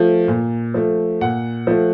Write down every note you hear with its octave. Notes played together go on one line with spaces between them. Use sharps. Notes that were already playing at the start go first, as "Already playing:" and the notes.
Already playing: F3 A3
A#2
F3 A3
A#2 F#5
F3 A3